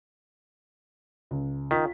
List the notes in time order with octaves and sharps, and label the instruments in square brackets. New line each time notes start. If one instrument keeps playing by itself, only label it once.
[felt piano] C#2
[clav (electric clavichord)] D#3 [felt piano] F4 B6